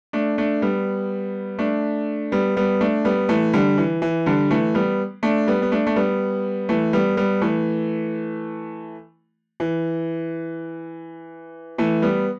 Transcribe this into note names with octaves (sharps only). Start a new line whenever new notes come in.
A3 D4
A3 D4
G3 B3
A3 D4
G3 B3
G3 B3
A3 D4
G3 B3
E3 A3
D3 G3
E3
E3
D3 G3
E3 A3
G3 B3
A3 D4
G3 B3
B3
A3 D4
A3
G3 B3
E3 A3
G3 B3
G3 B3
E3 A3
E3
E3 A3
G3 B3